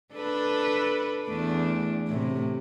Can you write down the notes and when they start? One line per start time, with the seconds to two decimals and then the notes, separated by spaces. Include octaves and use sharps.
0.13 D4 A4 B4
1.26 E2 A3 D4
2.08 A2 C3